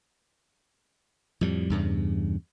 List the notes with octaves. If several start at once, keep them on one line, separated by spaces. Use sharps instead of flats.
F2 A2 G3
E2 G2 C#3